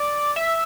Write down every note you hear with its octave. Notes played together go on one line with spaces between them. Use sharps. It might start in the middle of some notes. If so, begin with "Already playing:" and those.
Already playing: D5
E5